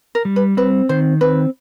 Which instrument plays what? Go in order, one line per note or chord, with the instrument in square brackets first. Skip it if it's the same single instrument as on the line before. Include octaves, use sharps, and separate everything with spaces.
[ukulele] A#4
[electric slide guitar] G3
[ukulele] B4
[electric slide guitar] C4 [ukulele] B4
[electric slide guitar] D#3 [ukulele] C5
[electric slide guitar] C4 [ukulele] B4